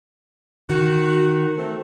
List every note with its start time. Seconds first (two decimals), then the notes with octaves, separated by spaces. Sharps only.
0.70 D#3 F#4
1.57 A3 C4